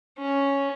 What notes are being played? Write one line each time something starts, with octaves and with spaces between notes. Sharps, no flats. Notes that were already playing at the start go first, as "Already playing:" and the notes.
C#4